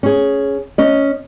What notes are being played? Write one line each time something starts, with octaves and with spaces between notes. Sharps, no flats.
C#4 G#4
C#4 D#5